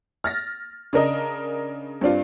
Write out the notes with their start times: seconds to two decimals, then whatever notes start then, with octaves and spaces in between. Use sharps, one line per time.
0.24 F6 A6 A#6
0.93 C#3 D4 A#4 D#5
2.01 G2 C4 D4 F4